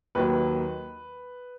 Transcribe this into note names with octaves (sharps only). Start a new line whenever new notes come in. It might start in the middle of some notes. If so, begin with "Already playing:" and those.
D#2 D#3 F#3 B4